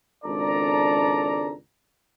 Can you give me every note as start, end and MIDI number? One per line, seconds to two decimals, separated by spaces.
0.25 1.54 32
0.25 1.54 37
0.25 1.54 62
0.25 1.54 69
0.25 1.54 74
0.25 1.54 82